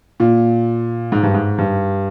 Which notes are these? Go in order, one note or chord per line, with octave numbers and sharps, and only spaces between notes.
A#2
G#2
G2
G#2
G2